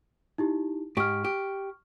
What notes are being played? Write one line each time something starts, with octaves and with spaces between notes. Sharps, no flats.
D#4 E4 G4
G#2 G4 C#6 F6
G4